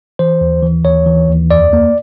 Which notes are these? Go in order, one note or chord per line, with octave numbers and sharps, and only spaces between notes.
E3 C5
D#2
E3
D#2 C#5
E3
D#2
F2 D5
A#3